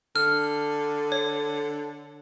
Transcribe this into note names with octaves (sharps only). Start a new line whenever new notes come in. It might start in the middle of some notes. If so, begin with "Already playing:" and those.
D3 F6
C#5